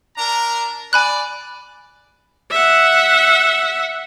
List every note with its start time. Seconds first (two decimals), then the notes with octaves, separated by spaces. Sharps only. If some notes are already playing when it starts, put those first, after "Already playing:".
0.17 D4 A#4 A#5
0.93 D5 G#5 B5 F#6
2.51 E5 F#5